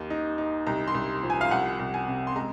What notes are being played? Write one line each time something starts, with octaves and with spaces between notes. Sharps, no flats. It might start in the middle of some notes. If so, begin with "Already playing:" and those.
Already playing: D#2
D#4
D#4
C2 A#5
C6
C2
F3
G#5
F5
C2 F#5
C2
G#5
C3
C6
G#3 A#5